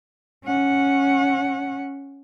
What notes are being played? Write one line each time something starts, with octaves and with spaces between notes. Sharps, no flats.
C#4 F#5